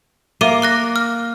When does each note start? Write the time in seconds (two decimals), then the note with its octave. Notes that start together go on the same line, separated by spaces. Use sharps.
0.41 A#3 E5 D6 D#7
0.62 D6 F#6 A#6
0.96 F6